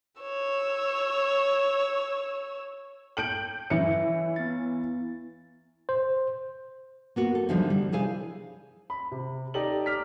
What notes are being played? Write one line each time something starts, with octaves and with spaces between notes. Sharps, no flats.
C#5 E6
G5 G6 D7 F#7
E3 C#5 E5 C#7
B3 E4 A6
C5
A#3 B3 F#4
A4
D3 E3 F3 G3 D#4
G3
C3 E4 G#4 C5 F5 G#5
B5
C3
D#4 G4 A4 D5 D#5 F#7
A#5 D6 F6 B6